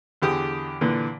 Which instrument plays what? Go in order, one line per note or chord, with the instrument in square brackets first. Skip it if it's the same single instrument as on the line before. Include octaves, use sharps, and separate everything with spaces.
[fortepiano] E2 D3 G4 G#4 D#6
A#2 D3 E3